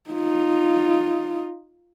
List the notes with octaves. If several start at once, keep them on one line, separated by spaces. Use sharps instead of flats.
D#4 F4